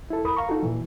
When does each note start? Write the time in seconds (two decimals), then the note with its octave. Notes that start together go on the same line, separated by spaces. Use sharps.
0.10 E4 A4
0.25 E2 A#4 B5 D#6
0.37 F5 A#5 C#6
0.49 D#4 F4 F#4 A4
0.63 A#2 E3